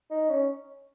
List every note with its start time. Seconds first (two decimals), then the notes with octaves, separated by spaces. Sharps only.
0.10 D#4
0.29 C#4